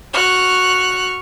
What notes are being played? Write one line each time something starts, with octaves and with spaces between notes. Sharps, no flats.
F#4 C#6 F6 F#6